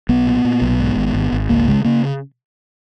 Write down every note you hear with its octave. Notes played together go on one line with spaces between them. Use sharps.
B1 B3
A#2
A#2
B1
G#2
G#1
G#1
G#1
C#2 A#3
C#3 G#3
C#3 A#3